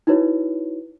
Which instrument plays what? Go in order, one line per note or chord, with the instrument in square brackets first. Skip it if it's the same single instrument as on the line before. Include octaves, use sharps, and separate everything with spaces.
[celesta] D#4 E4 F#4 B4 C#5